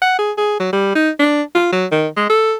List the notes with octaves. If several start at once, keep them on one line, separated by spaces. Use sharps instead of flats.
F#5
G#4
G#4
F#3
G3
D#4
D4
F4
F#3
D#3
G#3
A4